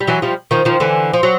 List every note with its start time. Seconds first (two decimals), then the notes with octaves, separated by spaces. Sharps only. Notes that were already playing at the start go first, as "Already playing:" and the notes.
0.01 G3
0.07 E3 F#3
0.22 F3 G3
0.51 D#3 F3
0.65 D#3 F3
0.80 D3 E3
1.13 F3
1.23 F#3